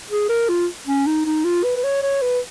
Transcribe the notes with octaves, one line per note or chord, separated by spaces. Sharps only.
G#4
A#4
F4
C#4
D#4
D#4
F4
B4
B4
C#5
C#5
B4